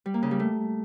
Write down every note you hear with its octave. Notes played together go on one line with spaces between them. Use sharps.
G3
A#3
C#3
G3
A3